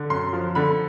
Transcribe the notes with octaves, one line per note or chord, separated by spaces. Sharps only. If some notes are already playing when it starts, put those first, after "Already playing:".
Already playing: D3
F#2 C6
F3
D3 B5